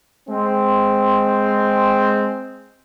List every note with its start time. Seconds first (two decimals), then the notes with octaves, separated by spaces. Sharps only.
0.29 G#3 C4